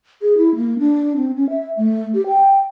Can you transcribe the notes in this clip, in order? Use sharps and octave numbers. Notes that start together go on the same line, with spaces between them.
G#4
E4
A#3
D4
C4
C#4
E5
A3
G4
G5